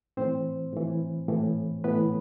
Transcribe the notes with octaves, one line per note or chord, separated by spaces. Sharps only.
A2 E3 C4 C5
A2 E3
A2 E3
A2 E3 B3 B4